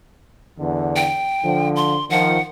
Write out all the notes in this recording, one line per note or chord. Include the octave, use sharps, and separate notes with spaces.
E2 D3
G5
D3 F3
C6
D#3 F3 F#5